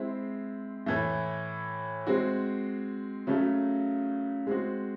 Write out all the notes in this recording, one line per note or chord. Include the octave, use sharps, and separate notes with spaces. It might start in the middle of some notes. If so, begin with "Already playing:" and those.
Already playing: G#3 C4 E4
A2 E3 A3
G#3 C4 F#4
C#3 F#3 A3
G#3 C4 F#4